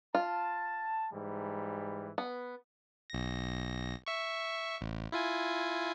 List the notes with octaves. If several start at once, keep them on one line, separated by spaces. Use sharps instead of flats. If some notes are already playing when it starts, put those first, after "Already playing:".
F4 A5
G#2 E3 G3
B3
B1 A#6
E5 C#6
A1
E4 F4 G#5